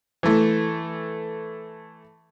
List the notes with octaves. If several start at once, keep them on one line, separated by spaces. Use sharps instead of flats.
E3 A3